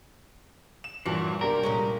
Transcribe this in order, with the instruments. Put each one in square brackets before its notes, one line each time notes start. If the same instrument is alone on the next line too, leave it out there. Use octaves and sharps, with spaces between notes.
[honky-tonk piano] E7
[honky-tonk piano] D2 G2 A#2 [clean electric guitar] E3 [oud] F#3
[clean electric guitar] C2 A#4 [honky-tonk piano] A#3 D4 G4
[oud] A#2 G#3 C#4